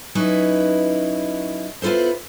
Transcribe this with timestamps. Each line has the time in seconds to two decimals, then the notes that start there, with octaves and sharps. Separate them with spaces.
0.15 F#3 C#4 D#4 E4 B4
1.82 B3 E4 F4 A4 C5